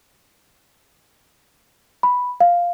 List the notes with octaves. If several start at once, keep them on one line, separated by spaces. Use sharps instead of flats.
B5
F5